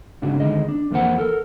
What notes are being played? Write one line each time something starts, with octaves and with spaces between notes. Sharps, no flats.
G#2 C#3 D4 F#4
D2 D#3 G#3 D#5
D4
F2 E3 A#3 C5 F#5
A4 A#4